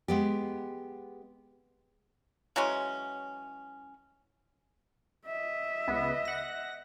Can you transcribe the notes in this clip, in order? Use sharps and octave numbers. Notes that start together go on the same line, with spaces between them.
G#3 B3 G4
E3 F#3 G#3 C#4
D#5 E5
C#2 B3
F#5 A#6